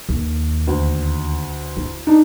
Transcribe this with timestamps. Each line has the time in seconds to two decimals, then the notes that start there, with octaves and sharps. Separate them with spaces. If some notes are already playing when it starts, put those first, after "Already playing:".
0.09 D#2
0.67 D2
1.77 E4
2.07 D4 D#4